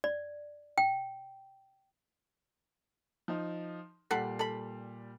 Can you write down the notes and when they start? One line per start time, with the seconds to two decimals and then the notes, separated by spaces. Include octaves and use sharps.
0.04 D5
0.78 G5
3.28 F3 D#4
4.11 A#2 G3 A4 F#5 B5 C7
4.39 A4 B5